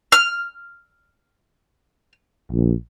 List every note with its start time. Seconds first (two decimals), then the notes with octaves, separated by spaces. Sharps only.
0.12 F6
2.52 A#1